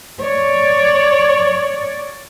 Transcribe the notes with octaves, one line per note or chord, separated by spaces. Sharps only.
C#5 D5